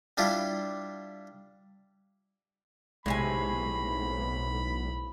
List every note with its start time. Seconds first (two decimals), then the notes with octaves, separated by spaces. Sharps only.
0.17 G3 D4 E4 F4 G4
3.06 B1 A2 C3 G#3 G#5 B5